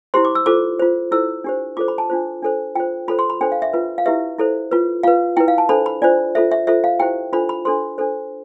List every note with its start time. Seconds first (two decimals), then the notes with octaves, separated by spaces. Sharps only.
0.14 E4 G4 C5 C6
0.25 D6
0.35 E6
0.46 F4 A4 C5 D6
0.80 F4 C5
1.11 E4 A4 C5 E6
1.44 D4 G4 C5
1.77 F4 A4 C5 D6
1.88 B5
1.98 A5
2.10 D4 F4 C5
2.43 D4 A4 C5
2.75 F4 C5 G5
3.08 F4 A4 C5 B5
3.19 C6
3.30 B5
3.41 D4 A4 C5 G5
3.52 F5
3.62 E5
3.73 F4 B4
3.98 F5
4.06 E4 G4 B4 E5
4.38 E4 A4 C5
4.71 F4 B4
5.03 F4 B4 F5
5.37 E4 B4 G5
5.48 F5
5.58 A5
5.69 D4 A4 C5 B5
5.86 B5
6.02 D4 F4 C5 D5
6.35 F4 A4 C5 E5
6.52 E5
6.67 F4 A4 C5 E5
6.84 F5
7.00 E4 G4 C5 G5
7.33 D4 F4 A4 C5 B5
7.49 B5
7.65 D4 A4 C5 C6
7.98 D4 A4 C5